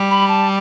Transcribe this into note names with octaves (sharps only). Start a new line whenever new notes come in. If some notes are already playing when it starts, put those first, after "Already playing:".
Already playing: G3
B5
A5